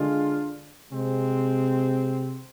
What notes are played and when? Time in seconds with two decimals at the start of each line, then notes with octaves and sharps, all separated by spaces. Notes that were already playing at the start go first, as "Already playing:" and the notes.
Already playing: D3 G#3 D4 F4
0.90 C3 G#3 C4